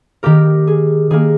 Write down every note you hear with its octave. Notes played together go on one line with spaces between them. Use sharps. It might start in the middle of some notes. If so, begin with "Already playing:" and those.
D#3 A#3 G4 A#4
G#4
D#3 A#3 G#4